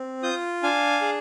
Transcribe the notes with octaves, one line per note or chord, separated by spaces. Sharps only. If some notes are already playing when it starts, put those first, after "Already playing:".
Already playing: C4
F4 D#6 G6
D4 F5 G#5
G#4